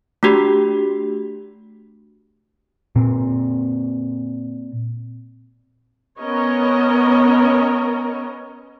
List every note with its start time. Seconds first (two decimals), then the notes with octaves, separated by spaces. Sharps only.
0.23 A3 D4 F#4 G4
2.96 A#2 C4
6.19 B3 C#4 A#4 C#5 D#5